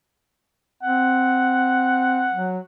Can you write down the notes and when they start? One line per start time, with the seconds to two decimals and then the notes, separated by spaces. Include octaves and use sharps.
0.83 C4 F#5
2.32 F#3